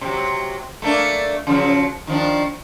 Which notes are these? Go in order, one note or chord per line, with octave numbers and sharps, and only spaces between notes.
C3 F#3
A3 A#3 D4
C#3 F3 F#3
D#3 F3 D4